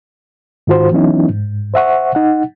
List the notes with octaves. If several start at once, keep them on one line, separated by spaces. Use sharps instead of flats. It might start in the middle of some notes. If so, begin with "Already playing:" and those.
G#2 D#3 F4 F#4 C5
E3 F#3 B3 C#4 D#4 E4
G#2
C5 E5 F#5 C#6
D#4 F#5